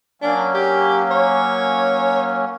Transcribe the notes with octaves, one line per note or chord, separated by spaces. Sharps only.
F#3 A#3 C#4 D4
G4
C#5